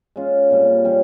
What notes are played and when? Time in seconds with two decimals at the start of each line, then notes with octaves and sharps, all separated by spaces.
0.16 G#3 C#4 F4
0.50 A#2 G3 C4
0.85 G3 C#4 G4 C#5